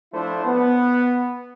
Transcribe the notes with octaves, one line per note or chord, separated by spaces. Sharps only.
F3 A3 D4 E4 C5
B3